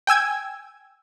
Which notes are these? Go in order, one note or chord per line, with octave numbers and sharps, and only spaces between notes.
G5 G#5 E6 G#6